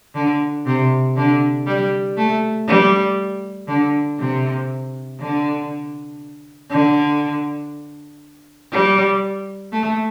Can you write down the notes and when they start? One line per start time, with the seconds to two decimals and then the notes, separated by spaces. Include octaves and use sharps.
0.15 D3
0.66 C3
1.16 D3
1.67 G3
2.17 A3
2.67 G3
3.68 D3
4.19 C3
5.19 D3
6.70 D3
8.72 G3
9.72 A3